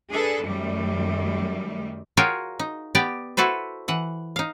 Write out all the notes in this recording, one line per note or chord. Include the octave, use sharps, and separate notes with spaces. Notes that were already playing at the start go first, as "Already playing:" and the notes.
D4 G#4 A4 B4
F#2 D#3 G3 A3
F4 F#4 G#4 A#4 C#5 G5
D#4
B3 G4 D5 G5
E4 F#4 A4 B4 C5
E3 F#5
D#4 F5